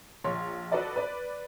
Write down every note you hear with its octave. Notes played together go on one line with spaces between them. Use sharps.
A#1 C#5 C6
F#4 A4 B4 D5 D#5
B4 D5